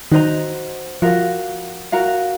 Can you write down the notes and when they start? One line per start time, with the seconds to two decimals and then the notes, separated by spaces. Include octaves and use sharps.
0.11 D#3 D#4 F#4 C5 D#5 A#5
1.02 F3 F4 F#4 A#4 F5
1.92 F#4 A#4 F5 A#5